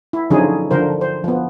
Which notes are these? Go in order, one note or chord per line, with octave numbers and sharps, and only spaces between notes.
E4
D3 F3 F#3 C#4 D#4 G#4
D3 F3 A#4 C5
C5
F3 B3